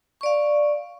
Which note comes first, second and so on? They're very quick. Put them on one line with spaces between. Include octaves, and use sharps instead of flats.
C#6 D5 F5